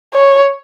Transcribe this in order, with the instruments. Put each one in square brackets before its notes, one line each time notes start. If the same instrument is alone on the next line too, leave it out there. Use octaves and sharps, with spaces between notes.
[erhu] C#5